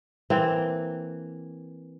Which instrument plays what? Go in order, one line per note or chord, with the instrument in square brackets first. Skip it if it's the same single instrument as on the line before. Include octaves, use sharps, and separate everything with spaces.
[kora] E3 A#3 C4